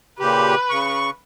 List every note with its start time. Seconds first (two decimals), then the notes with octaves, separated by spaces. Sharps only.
0.20 A#2 C#3 G4 B4
0.70 C#3 C#6